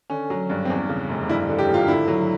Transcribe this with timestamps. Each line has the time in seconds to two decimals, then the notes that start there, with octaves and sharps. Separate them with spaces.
0.10 D3 C#4
0.30 F#3
0.50 G2
0.65 C4
0.70 E2 C#4
0.89 C#3
1.09 F1
1.29 G2 E4
1.49 D3
1.59 G4
1.68 G#1
1.74 F4
1.88 D3 E4
2.08 F#3